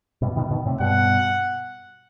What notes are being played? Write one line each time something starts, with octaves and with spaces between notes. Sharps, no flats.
G2 B2
B2 D#3
B2 D#3
A2 C3
G2 B2 F#5